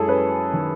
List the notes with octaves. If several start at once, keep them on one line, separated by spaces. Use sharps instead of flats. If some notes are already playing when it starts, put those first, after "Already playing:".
Already playing: F#2 G#3 E4 G#4 A4
C#4 B4
D#3